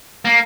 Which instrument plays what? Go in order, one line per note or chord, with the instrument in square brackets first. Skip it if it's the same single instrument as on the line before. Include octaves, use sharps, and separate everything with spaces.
[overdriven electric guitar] A#3